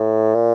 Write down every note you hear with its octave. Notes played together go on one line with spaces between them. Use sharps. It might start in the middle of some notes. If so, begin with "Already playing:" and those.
Already playing: A2
A#2